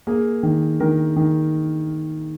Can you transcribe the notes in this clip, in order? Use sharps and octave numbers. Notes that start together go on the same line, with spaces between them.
A#3 G#4
D#3
D#3 A#4
D#3